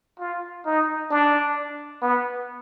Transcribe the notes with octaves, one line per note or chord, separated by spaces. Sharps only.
F4
D#4
D4
B3